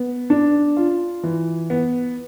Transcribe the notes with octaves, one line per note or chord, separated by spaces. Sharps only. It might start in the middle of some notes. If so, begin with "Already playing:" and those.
Already playing: B3
D4
F4
E3
B3